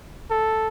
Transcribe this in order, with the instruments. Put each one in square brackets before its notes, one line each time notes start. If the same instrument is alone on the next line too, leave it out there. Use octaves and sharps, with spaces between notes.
[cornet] A4